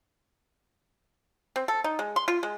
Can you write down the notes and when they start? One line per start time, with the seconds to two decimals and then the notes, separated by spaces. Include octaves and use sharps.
1.56 C4
1.68 A4
1.84 D#4
1.99 G#3
2.16 C6
2.28 F4
2.43 G#3